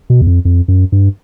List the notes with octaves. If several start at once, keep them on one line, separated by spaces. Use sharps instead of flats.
B2
E2
F2
F2
F#2
G2